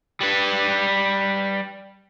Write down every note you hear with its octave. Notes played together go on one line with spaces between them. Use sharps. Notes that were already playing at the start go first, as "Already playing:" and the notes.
G3 B4